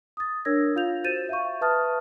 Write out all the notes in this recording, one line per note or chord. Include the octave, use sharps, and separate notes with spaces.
D#6 A6
D4 A#4 C#5 E6 G#6 A#6
F4 F5 G6 F7
F#4 C5 G6 A6 D#7 E7
E5 F5 C#6
B4 E5 A5 D#6 F6 A6